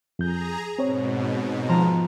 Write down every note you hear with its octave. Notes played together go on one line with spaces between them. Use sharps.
F2 G#4 A#5 G6
G#2 B2 C4 C#5
F3 A#5